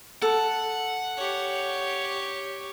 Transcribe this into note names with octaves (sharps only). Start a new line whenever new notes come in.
A4 F#5
G4 C#5